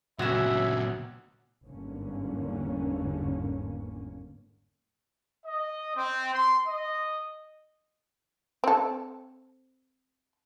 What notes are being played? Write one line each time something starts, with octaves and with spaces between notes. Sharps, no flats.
G1 A#2 C#3 F#3 C#4 E5 E7
G1 E2 G#2 D3 A#3 C#4
D#5
C4
C6
D#5
C4 A4